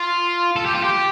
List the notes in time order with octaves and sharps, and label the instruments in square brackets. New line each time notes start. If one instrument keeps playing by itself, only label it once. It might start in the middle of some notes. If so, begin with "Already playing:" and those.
Already playing: [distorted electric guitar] F4
A4
G4
F4
G4